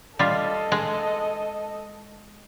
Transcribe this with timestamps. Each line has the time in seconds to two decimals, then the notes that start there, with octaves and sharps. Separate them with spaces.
0.19 G3 F4 A4 D#5
0.72 G#3